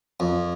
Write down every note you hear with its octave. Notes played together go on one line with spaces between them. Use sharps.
F2